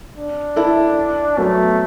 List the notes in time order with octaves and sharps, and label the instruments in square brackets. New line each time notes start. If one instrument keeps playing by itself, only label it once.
[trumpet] D4
[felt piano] E4 A4
[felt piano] F#3 B3 [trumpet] A3